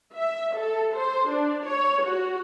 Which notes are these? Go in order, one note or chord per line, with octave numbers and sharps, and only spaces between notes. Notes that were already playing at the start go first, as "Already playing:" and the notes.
E5
A4
C5
D4
C#5
F#4